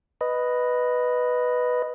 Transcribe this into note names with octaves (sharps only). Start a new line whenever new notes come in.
B4 D#5